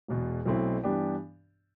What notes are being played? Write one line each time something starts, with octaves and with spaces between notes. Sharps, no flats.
E1 E2 B2
B1 B2 A3 C4 E4
G2 E3 B3 D4 G4